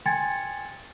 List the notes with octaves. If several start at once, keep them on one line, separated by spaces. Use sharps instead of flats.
G5 G#5 C6 G#6 A6 C#7